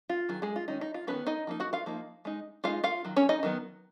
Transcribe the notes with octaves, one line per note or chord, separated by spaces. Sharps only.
F4
D#3 F#3 G#4
G#3 G#4
F4
D#3 G#3 C#4 D#4
D#4
F4
D#3 G#3 B3 C#4 B4
D#4 D#5
F3 A#3 D#4
F#4 F#5
F4 F5
F3 A#3 D#4
G#3 D#4
G#3 D#4 F4 F5
F4 F5
D#3 F#3
C#4 C#5
D#4 D#5
D#3 F#3 B3